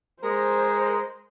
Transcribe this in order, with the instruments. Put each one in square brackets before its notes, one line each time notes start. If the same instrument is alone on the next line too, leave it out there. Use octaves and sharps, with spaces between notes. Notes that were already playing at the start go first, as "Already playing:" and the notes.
[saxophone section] G#3 A#4 [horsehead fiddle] C5